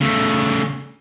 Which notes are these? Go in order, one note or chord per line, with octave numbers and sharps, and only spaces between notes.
C#3 A3